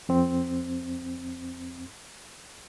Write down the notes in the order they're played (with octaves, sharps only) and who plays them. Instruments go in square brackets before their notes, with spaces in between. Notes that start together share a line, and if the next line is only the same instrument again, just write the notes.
[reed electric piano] F2 C4